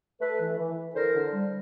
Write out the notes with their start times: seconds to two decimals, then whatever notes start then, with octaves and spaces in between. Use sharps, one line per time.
0.21 A3 A4 B4
0.40 E3
0.59 E3
0.77 E3
0.96 D3 A#4 C5
1.15 D3
1.33 G3